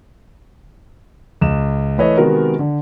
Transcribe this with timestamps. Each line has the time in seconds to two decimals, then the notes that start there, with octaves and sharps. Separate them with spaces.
1.41 C#2 E7
1.98 E3 A3 B4 C#5 D#5
2.17 C3 D#3 G#3 B3 F#4 A#4
2.59 D3